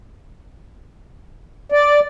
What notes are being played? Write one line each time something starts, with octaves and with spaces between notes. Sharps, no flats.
D5